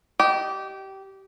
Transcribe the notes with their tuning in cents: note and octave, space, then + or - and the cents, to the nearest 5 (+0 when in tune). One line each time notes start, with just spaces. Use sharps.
G4 -20 D#5 -15